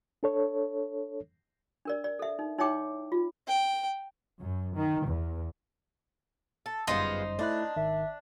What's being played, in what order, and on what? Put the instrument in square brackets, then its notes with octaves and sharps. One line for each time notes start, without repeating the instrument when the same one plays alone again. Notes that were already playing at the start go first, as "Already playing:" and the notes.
[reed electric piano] D4 A4 C#5
[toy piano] D4 A#4 D5
D5
A4 E5
D#4
D#4 E4 C#5 E5 G5 D6
F4
[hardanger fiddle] G5
[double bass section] F#2
D#3
E2
[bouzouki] A4
[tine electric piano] G1 F#2 G3 [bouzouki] G#3 B3 F4 [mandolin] D#4 C5
[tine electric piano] A3 E4 F#6 [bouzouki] D4
[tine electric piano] G#1 D#3 [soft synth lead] E5